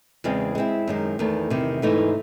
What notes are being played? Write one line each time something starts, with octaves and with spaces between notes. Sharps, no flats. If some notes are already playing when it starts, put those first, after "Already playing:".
E2 C#3 G#3 C4
G#3 C4 E4
F#2 D#3 G#3
E2 D#3 A3
E2 C3 D#3
G#2 E3 A3 D#4